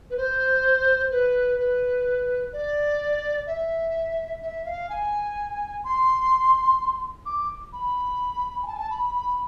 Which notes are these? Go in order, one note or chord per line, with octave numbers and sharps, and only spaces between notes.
B4
C5
B4
B4
D5
E5
E5
F5
G#5
C6
D6
B5
G#5
A5
G#5
A5
B5
B5
B5